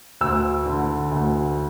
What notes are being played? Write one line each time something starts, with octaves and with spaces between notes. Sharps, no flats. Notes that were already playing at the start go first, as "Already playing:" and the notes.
D2 E6
D3
D2